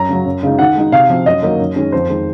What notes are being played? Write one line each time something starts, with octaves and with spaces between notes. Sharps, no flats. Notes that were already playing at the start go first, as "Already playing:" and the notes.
Already playing: F#2 A#5
C#3 F#3
F#2
C#3 G#3 D#4
D#3 F#5
G#3 D#4
C3 F5
F3 C4
F#2 D#5
D#3 F#3 A#3 D#4
F#2
D#3 G#3 C#4
F2 C5
D#3 G#3